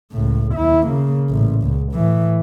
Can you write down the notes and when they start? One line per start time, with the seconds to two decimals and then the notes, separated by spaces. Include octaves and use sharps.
0.12 C#2 A2
0.54 D#2 E4
0.87 C#3 A#3
1.30 A1 A#2
1.63 C#2
1.93 A2 E3